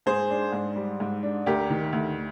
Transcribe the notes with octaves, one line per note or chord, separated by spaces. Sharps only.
G#2 G#4 C5
D4
G#2
G3
G#2
D4
D2 G4 A#4
D#3
D2